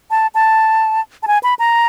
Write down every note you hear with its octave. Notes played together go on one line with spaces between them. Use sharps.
A5
A5
A5
G#5
B5
A#5